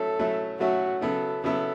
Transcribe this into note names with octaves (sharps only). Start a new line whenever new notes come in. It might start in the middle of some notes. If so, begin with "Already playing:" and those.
Already playing: F#3 A3 C#4 E4 A4
F#3 A3 C#4 E4
F#3 A3 C#4 E4 F#4
C#3 F#3 B3 E4 A4
C#3 F#3 B3 E4 A4